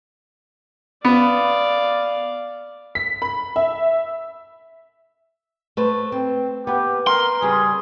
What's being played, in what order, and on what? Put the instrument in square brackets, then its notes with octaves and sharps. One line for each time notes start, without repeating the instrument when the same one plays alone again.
[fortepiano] B3 [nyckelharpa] D5 F5
[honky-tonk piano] B6
B5
E5
[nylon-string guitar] A3 B4 C5
C4
[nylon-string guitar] B3 B4 [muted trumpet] G4
[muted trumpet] A#4 [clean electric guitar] C6
[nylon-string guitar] C#3 G3 [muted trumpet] G#4